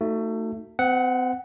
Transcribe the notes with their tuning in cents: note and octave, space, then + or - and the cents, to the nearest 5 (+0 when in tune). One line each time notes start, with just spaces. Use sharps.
A3 +25 D#4 +0 F#4 +0
C4 -40 F#5 +0